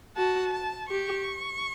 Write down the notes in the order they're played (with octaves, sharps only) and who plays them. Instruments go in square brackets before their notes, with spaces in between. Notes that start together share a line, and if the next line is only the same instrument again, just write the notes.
[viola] F#4 [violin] A5
[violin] A5
[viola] G4 [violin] C#6